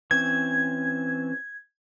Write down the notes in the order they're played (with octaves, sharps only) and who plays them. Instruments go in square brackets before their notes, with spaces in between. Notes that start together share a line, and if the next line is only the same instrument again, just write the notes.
[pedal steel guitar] E3 C4 C#4 [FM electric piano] G#6